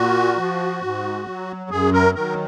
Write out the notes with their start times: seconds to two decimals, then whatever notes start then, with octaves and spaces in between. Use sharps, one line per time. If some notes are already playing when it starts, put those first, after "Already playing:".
Already playing: A#2 F#4
0.38 F3
0.82 G#2
1.26 F#3
1.70 F#2 G#4
1.93 A#4
2.14 D#3 F#3 A#4